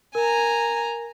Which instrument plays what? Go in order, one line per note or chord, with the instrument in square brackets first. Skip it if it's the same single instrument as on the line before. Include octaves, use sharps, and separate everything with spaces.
[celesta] A#4 [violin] G#5 A#5